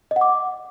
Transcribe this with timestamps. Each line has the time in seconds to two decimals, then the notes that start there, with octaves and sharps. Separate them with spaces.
0.11 D#5
0.16 F#5
0.21 D6